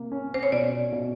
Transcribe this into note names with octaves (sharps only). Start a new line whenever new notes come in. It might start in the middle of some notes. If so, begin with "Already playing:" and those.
Already playing: C3 A#3
C#4
C5
C#5
B2 D5
B2